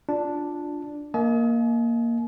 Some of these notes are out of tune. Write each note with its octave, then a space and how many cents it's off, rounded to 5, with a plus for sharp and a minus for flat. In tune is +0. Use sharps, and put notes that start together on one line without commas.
D4 +0 F4 +0
A#3 +0 D#5 +30 G#5 +45